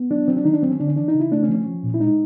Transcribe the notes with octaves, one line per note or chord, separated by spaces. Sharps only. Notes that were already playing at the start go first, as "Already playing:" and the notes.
Already playing: B3
F#3 D4
F#3 C4
D4
D#3 D#4
D4
F#3 C4
C#4
D3 D4
C#4
E3 D4
D#4
C#3
E4
A3 D4
C#4
F3
C#4
F3
A#2
E4
G#3 D#4